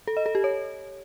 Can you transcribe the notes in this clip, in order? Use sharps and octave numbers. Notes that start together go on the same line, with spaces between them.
A4
D#5
A4
G4
C#5